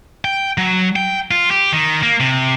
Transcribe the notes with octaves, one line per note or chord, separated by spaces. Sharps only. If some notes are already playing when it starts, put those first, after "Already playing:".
G5
F#3
G5
F4
G4
D#3
A#3
C3